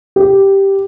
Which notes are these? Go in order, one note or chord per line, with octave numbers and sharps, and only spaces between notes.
G4